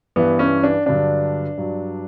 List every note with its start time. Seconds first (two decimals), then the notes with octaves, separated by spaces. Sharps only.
0.16 G2 E3 B3
0.39 C#4
0.64 D4
0.86 G2 D3 F#3 D4
1.58 G2 F#3